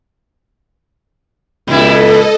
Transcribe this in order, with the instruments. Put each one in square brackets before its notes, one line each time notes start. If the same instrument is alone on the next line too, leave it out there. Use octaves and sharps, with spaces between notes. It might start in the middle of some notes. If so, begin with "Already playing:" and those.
[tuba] C#2 [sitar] A#2 E4 [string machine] A4 D#5